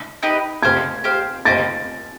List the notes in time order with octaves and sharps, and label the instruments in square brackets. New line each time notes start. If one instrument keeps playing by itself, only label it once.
[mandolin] D#4 G4 B4
[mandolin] G4 C5 F5 [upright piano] G#6
[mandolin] G4 C5 F5
[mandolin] A#3 D#4 G4 C5 [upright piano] A6